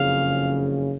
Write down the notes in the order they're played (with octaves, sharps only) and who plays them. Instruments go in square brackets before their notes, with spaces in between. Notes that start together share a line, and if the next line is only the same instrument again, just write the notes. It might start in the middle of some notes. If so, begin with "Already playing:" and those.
Already playing: [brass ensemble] F#1 F2 C#3 [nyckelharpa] F5